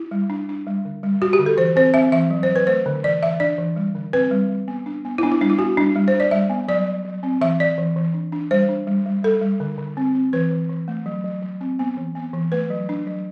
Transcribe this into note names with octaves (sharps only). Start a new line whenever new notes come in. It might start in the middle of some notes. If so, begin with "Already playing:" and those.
Already playing: E4
G3
D4
D4
G3
D3
G3
G3 F#4
G4
D3
A4
E3 C5
C4 C5
C4 E5
E3 E5
F#3
C5
F#3
B4
A3 C5
D3
E3 D5
E3 E5
D4 D5
E3
G3
D3
C4 B4
G3
G3
B3
D4
B3
E4
B3 D4
E4
G3 D4
E4
B3 F#4
G3 D4
G3
C5
D4
D5
G3 E5
B3
F#3 D5
F#3
F#3
C4
E3 E5
E3 D5
E3
E3
D4
D4
G3 C5
D4
G3
G3
G3 A4
G3
D3
D3
C4
C4
E3 B4
E3
E3
A3
F#3
F#3
F#3
C4
B3
E3
B3
E3
A3 B4
F#3
D4
F#3